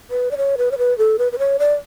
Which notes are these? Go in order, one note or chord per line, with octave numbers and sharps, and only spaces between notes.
B4
D5
C#5
B4
C#5
B4
A4
B4
B4
C#5
D5